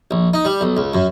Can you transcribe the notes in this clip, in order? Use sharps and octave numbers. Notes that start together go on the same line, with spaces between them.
A#1
D#4
G3
B1
C#2
F#2